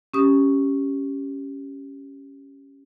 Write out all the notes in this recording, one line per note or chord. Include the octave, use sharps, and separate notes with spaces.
C#4 G4 D#6